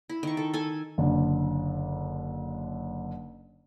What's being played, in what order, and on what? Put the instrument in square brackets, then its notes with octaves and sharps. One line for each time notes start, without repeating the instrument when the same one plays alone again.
[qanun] E4
D#3 C#6
A4
A4 G#5
[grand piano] F#1 D3